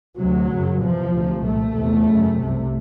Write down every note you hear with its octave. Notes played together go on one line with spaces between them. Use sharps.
D2 C3 F#3
F#2 C#3
E2 C3 F3
D2 C3
C2 A#2 A3
E2 C3
F#2 C#3
C2 C3